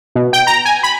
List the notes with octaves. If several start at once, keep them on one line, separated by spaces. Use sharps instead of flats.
B2
G5
A#5
G#5
B5